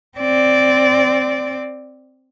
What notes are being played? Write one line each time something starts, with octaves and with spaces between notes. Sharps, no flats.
C4 D5